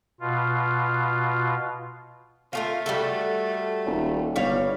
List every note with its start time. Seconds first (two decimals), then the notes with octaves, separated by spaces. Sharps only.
0.20 B2 F4
2.53 A3 F4 G4 A#4
2.86 G3 F#4 A4
3.86 D#1
4.36 G1 G3 C#5 F5